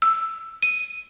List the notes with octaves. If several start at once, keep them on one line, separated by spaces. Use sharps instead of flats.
E6
D#7